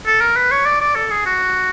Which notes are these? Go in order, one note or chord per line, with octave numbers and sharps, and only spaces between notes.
A4
A#4
B4
C#5
D5
D5
A4
G#4
F#4